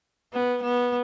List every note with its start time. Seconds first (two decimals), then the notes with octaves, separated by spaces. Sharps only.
0.33 B3
0.63 B3